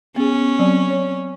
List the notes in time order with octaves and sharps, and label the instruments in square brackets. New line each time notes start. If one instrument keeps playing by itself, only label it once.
[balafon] B3 G#4 [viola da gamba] C#4
[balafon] F#3 C4 D5
C#5